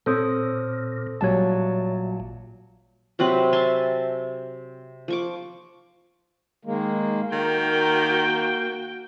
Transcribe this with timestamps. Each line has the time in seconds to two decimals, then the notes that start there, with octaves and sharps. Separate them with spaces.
0.06 A#2 C4 A4 C5 C#5 D#6
1.21 A1 A#2 F#3 G3 C#5 A5
3.19 C3 F#3 C4 B4
3.53 E5 G#5 A5 C6
5.08 F3 C#6 D6
6.65 D#3 G#3 A#3
7.32 D#3 A#3 F#4 G5